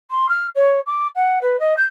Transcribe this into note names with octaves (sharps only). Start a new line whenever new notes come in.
C6
F6
C#5
D6
F#5
B4
D#5
G6